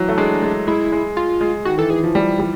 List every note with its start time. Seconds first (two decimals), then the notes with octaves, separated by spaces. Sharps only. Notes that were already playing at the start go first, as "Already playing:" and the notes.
Already playing: E3 F#3
0.09 A3
0.18 G#3 D4
0.43 G#3
0.67 G#3 E4
0.92 G#3
1.17 F4
1.41 G#3
1.65 D#3 F#4
1.78 E3 A4
1.90 E3 G#4
2.03 F3
2.15 G3
2.39 G3